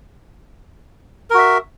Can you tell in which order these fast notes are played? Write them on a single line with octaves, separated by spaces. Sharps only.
A#4 F#4 E5